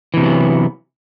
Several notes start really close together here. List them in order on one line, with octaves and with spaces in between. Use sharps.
E3 C3 B3 F#3